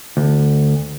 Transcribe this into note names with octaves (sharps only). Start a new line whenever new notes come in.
D2